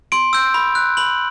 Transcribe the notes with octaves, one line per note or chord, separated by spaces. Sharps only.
C6 D7
E6 G6
B5
F#6
B5 F#7